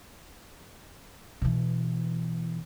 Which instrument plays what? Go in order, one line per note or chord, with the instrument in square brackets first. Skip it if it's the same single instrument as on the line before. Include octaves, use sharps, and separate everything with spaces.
[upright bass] B2 E3